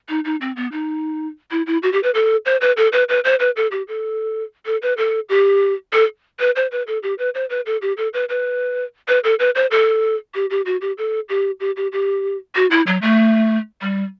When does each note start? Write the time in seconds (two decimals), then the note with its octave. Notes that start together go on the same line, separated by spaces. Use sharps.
0.09 D#4
0.25 D#4
0.41 C4
0.56 B3
0.72 D#4
1.51 E4
1.67 E4
1.83 F#4
1.93 G4
2.03 B4
2.14 A4
2.46 C5
2.61 B4
2.77 A4
2.93 B4
3.09 B4
3.25 C5
3.40 B4
3.56 A4
3.71 G4
3.88 A4
4.66 A4
4.82 B4
4.98 A4
5.29 G4
5.93 A4
6.40 B4
6.56 C5
6.72 B4
6.87 A4
7.03 G4
7.19 B4
7.35 C5
7.50 B4
7.66 A4
7.82 G4
7.97 A4
8.14 B4
8.29 B4
9.08 B4
9.24 A4
9.39 B4
9.55 C5
9.71 A4
10.35 G4
10.50 G4
10.66 F#4
10.81 G4
10.98 A4
11.29 G4
11.60 G4
11.77 G4
11.92 G4
12.55 F#4
12.71 E4
12.87 F#3
13.02 A3
13.81 G3